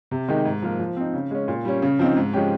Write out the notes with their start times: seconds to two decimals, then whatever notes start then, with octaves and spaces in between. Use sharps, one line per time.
0.11 C3
0.28 D#3 G#3 D#4 G4
0.45 G#2
0.62 F3 A#3
0.80 F3
0.97 C4 D#4
1.14 C#3
1.31 G#3 C#4
1.48 A#2
1.65 G3 C#4
1.82 C#3
1.99 F3 C4 D#4
2.17 G#2
2.33 F3 G#3 C#4 G4